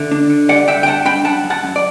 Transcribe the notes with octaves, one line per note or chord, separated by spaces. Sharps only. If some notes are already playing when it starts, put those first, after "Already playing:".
Already playing: D3 E5
D4
D3
G3 D5 F#5
D3 E5 G5
G5
G2 F#5 A5
D4 G5 B5
F#2 F#5 A5
F#2
F#5 A5
F#2
D5